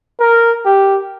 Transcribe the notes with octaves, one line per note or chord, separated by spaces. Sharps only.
A#4
G4